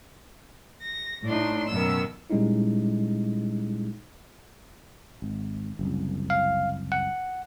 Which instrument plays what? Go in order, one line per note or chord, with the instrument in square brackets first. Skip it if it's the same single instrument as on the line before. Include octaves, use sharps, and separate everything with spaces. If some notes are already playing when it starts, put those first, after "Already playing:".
[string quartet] A#6
[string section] A2 [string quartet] D4 D#4 C6
[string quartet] F#2 B2 D#3 [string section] E6
[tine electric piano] A#2 G3 G#3 C#4 D#4 E4
[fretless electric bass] G#1
F#1 C2
[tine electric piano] F5
F#5